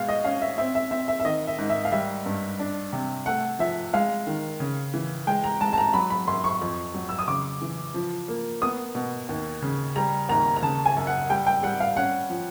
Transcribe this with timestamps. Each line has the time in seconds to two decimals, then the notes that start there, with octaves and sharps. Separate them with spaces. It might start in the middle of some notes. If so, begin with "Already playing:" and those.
Already playing: B2 G#3 F5
0.09 D#5
0.25 C#4 F5
0.42 E5
0.58 C4 E5
0.75 E5
0.91 C4 E5
1.08 E5
1.20 E5
1.25 D#3 D#5
1.47 E5
1.58 G#2
1.70 E5
1.85 F5
1.92 G3 E5
2.26 G2
2.59 D4
2.93 C3
3.26 A3 F#5
3.59 F3 E5
3.93 G#3 F5
4.27 D#3
4.60 C#3
4.94 E3
5.27 G#3 G5
5.44 A#5
5.60 G#3 A5
5.73 A5
5.78 A#5
5.94 F#3 B5
6.10 B5
6.27 F#2 C6
6.44 C#6
6.61 F2
6.94 F#3
7.09 E6
7.19 D#6
7.28 C#3 D6
7.61 E3
7.94 F3
8.28 A#3
8.61 B3 D#6
8.95 B2
9.29 D#2
9.62 C#3
9.96 G3 A#5
10.29 D#2 A#5
10.56 A#5
10.63 C#3 A5
10.86 G#5
10.97 F#2
11.07 F#5
11.30 G3 G5
11.47 G5
11.63 G3 F#5
11.80 F5
11.96 C#4 F#5
12.30 F3